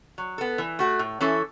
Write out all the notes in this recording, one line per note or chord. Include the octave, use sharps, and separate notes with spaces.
F#3
B3 A4
E3
A3 F#4
A2
E3 C#4 E4 A4